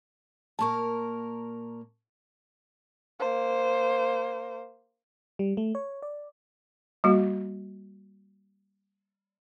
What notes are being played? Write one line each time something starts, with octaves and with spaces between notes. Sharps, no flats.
A#2 A#3 A#4 A5 C#6
A#3 C5
G3
A3
C#5
D5
G3 A#3 F#4